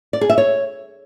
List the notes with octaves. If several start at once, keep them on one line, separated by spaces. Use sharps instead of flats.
D5
G#4
E5
C#5